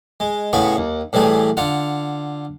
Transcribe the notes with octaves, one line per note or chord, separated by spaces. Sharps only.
G#3
A2 C#3 B3 G#4 B5 C#6
D#2
A2 E3 G3 A3 G#4
D3 F4 F#5